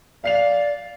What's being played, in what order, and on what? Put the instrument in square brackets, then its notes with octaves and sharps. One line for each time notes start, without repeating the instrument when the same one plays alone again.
[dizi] D5 [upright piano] F5 C7 F7